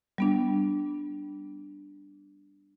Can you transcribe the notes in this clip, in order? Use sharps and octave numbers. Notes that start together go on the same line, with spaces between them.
G3 B3 D4